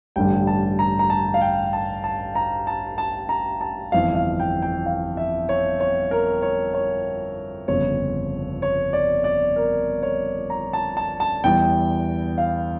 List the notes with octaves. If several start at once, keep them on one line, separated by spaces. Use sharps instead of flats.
A1 G2 D3 G3 G5
A5
A#5
A#5
A5
F5
G5
A5
A5
A#5
A5
A5
A#5
A5
G1 F2 E3 F5
F5
G5
G5
F5
E5
C#5
C#5
A#4
C#5
C#5
G1 F2 C#3 C#5
C#5
D5
D5
A#4
C#5
A#5
A5
A5
A5
E2 E3 G3 G5
F5